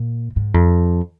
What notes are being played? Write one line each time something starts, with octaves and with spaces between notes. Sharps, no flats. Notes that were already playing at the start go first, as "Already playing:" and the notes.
Already playing: A#2
G#2
F2